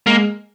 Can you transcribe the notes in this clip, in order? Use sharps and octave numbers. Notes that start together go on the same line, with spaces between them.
G#3 A#3